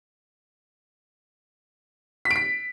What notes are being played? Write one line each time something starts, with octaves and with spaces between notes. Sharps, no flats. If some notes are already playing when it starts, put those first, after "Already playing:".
B6
D7
B6